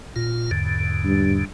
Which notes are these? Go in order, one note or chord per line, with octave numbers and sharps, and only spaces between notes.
A#2 F4
E2 G#2 D3
G2